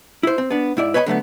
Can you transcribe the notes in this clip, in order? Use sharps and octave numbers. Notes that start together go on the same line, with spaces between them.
E4 C5
C4
B3 D4
G#2 E4 D5
B4 C#5 D#5 F#5 B5
D3 F#3 A3 B3